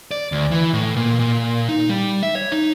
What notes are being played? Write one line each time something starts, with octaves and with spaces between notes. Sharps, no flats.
D5
D2
E3
A2
A#2
A#2
D#4
G3
E5
C#5
D#4